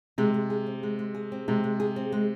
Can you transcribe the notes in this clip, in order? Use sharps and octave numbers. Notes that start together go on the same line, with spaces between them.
C3 G#3
G#3
G#4
C4
G#3
G#3
G#4
C4
C3 G#3
G#3
G#4
C4
G#3